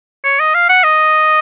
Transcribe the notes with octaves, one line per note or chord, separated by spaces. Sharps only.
C#5
D#5
F5
F#5
D#5